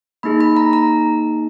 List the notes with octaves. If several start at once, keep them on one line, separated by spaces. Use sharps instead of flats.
A#3 D#4 G#4 B5
B5
A#5
A#5